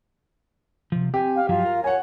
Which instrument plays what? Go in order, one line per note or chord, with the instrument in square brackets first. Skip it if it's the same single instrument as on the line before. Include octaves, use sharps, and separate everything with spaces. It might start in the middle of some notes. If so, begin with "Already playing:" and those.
[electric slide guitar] C3 F3
[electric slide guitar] C4 G#5 [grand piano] G4
[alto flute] F5
[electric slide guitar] G2 F3 F#3 [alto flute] F4
[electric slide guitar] A#4
[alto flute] C#5 [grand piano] F#5 G#5